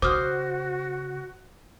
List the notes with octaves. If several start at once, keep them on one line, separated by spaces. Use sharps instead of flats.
C#3 F#4 C5 D6 D#6 F6